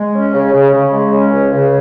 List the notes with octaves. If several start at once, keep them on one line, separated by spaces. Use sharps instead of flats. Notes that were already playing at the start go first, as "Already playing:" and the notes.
Already playing: G#3
C#4
C#3
C#3
C#3
G#3
C#4
C#2
C#3